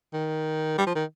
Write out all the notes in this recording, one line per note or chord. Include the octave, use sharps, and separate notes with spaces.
D#3
G3
F3
D#3